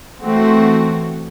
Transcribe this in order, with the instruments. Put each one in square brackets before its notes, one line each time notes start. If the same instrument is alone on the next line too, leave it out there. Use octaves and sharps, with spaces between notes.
[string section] E3 A3 C4 F#4